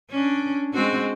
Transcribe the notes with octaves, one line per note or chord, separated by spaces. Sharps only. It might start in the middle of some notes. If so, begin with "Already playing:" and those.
C#4 D4
G#3 C4 F#4